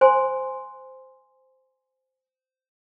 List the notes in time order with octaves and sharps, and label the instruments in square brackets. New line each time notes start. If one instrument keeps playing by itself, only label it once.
[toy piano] C5 G#5 C6